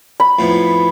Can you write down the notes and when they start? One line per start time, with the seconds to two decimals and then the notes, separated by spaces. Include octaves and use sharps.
0.20 B5
0.39 F2 A2 B3